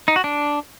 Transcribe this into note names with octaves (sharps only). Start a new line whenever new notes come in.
D#4
F#4
D4